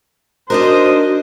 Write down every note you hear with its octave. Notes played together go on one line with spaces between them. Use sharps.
D4 D#4 F#4 A#4 C5 D#5